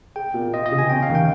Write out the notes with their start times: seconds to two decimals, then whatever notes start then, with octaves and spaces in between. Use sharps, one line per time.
0.16 G#4 G5
0.34 A#2
0.53 F4 D#5
0.66 D#5
0.72 C#3
0.78 G#5
0.89 C#4 G5
1.03 F5
1.10 D#2
1.15 G5